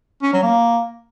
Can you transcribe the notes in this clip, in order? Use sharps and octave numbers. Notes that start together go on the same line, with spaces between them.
C#4
F#3
A#3